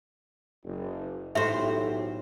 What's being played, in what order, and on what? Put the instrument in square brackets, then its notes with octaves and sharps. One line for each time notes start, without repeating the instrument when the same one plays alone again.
[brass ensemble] F#1
[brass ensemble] B1 F#4 G4 [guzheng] A2 C5 [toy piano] E5